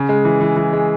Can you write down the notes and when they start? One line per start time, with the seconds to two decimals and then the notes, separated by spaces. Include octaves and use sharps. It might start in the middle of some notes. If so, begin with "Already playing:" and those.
Already playing: C#3
0.09 G#3
0.25 E3
0.41 E3
0.56 E3
0.73 G#3